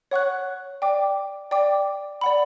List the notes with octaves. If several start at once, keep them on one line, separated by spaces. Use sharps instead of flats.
C#5 F#5 C#6 F#6
D5 G5 D6
D5 G5 D6
D5 F#5 B5